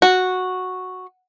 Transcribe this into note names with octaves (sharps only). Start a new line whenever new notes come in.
F#4